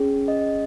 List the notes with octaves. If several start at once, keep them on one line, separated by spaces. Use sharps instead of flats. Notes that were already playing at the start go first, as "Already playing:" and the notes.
Already playing: C#4 G#4
D#5